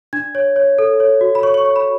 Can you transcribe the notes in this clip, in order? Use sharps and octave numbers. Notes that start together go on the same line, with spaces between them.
D4 G#6
C#5
C#5
A4
C#5
F#4
B5
C#5 C#6
C#6
C#5 C#6
B5